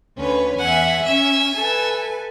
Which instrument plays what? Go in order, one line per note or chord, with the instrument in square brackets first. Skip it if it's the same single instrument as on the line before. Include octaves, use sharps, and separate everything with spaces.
[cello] D2 [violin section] C#4 B4 C#5
[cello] E2 [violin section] E5 G#5 [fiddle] F#5
[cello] C#4 [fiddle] E5 E6 [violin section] G#5
[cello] A4 B4